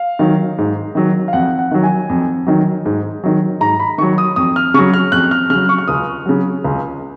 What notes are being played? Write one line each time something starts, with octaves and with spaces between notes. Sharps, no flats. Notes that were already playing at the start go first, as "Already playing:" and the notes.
Already playing: F5
D#3 F#3
G#2
D#3 F#3
F5
F2 F#5
F#5
D#3 F#3
G#5
F2
D#3 F#3
G#2
D#3 F#3
G#2 A#5
B5
D#3 F#3 C#6
D#6
F2 D#6
F6
C#3 F#3 C#6
F6
F2 F#6
F6
C#3 F#3 F6
C#6
F6
C#2 D#6
C#3 F#3
C#2